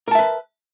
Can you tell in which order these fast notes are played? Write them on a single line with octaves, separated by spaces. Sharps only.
A#4 A5 E5 B4